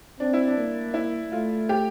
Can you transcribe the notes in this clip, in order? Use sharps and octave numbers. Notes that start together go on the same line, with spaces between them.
C4 D4
E4
D4
A#3
E4
A3 F4
G4